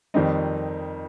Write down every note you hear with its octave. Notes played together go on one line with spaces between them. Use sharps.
F2 D#3 G3 C4 D#4